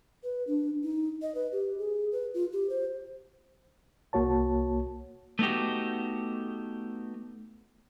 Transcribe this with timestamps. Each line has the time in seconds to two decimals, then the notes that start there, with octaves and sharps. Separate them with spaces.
0.23 B4
0.47 D4
0.83 D#4
1.22 D#5
1.35 B4
1.52 G4
1.78 G#4
2.12 B4
2.34 F4
2.53 G4
2.70 C5
4.13 C2 A#3 F#4 C#5 A5
5.39 A3 B3 D#4 F#4 G4